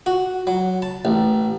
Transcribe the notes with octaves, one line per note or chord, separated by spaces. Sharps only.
F#4
F#3
A5
A1